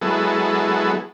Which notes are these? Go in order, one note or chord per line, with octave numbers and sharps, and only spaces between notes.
F#3 G#3 B3 E4 A4